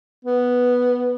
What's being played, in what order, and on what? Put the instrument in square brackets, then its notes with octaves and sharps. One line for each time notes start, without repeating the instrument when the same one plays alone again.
[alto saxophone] B3